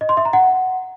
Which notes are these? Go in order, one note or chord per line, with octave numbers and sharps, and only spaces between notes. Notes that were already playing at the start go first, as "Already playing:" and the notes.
D#5
C6
E5
A#5
F#5